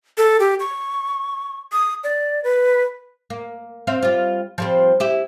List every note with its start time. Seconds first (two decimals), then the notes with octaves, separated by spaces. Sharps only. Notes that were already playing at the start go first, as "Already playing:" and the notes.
0.18 A4
0.40 G4
0.60 C#6
1.72 D#6
2.04 D5
2.44 B4
3.30 A#3
3.87 C4 E5 F5
4.02 G3 F4
4.58 F3 G3 C4
5.00 E4 G4